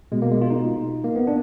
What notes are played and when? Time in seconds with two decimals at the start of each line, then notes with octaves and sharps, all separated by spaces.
0.12 B2 G#3
0.22 A#3
0.32 G#3
0.42 F4
0.50 D#4
1.04 A#3
1.16 B3
1.27 D4